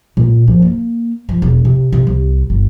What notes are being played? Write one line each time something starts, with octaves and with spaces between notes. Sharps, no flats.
A#2
F3
A#3
F3
E1
C3
C3
C2
G1